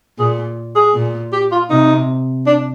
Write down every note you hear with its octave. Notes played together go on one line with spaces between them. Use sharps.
A#2 G#4
G#4
A#2
G4
F4
C3 D#4
D4